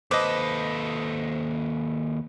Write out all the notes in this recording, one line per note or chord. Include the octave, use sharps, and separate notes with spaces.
D#2 A4 B4 C5 D#5 D6